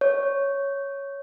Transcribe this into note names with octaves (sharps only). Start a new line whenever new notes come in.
C#5